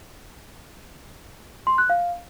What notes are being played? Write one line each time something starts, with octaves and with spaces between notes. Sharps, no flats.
C6
F#6
F5